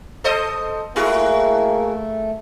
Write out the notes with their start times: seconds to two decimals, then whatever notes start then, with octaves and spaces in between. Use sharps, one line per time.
0.24 A4 C5 D#5
0.96 A3 A#3 E4 F#4 G#4